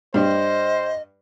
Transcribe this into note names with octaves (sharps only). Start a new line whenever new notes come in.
G2 G3 C5 D#5